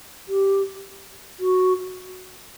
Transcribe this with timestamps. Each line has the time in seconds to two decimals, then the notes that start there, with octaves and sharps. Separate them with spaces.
0.28 G4
1.40 F#4